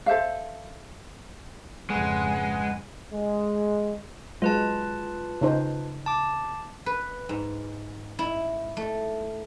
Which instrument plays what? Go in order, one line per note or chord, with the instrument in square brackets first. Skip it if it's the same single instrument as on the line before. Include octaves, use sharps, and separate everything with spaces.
[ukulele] A4 C5 E5 F5
[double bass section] F2 G#2 C#3 [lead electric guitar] G#3 [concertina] B4 F#5 G#5
[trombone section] G#3
[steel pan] F#3 G#3 [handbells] F4 B4 A5
[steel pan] C#3 D#4 C5
[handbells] A5 D6
[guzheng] B4
G#2
E4
A3